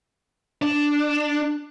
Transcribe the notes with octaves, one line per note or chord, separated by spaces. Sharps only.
D4